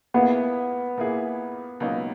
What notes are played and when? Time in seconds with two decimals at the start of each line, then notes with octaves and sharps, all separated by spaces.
0.14 A#2 A#3 B3 E4 G#4
0.97 A#2 A#3 E4 G#4
1.80 C#2 B2 F#3 A#3 D#4